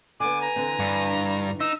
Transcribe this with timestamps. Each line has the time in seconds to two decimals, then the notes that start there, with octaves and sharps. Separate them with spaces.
0.20 D3 B3 G#5 D6
0.41 A#5
0.56 D3 E3 C4
0.79 G2
1.60 D#4 E6